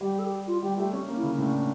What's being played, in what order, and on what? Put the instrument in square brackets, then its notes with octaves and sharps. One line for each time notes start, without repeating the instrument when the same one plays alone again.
[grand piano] G3 [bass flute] G4
[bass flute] A4
G4
F4
[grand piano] G3 [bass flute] G4
[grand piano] A3 [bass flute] G4
[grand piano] C#4
A#3
[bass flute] E4
[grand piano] C#3
[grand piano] A2 [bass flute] D4